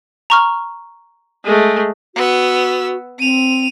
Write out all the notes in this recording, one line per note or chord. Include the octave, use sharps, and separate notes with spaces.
A#5 C#6 F6
G#3 A3
B3 F#4 E6
C4 D#7 F7